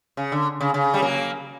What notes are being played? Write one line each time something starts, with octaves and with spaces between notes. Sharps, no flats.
C#3
D3
C#3
C#3
G3
F#3 A#3